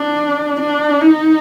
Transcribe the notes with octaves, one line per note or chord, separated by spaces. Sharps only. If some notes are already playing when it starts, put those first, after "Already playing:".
Already playing: D4
D4
D#4